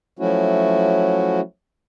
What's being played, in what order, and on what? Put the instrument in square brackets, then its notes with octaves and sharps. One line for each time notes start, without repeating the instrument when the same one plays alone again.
[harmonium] F3 F#3 A3 C#4 E4 F#4